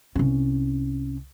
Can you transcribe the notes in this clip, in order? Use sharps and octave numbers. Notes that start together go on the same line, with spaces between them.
C2 C#4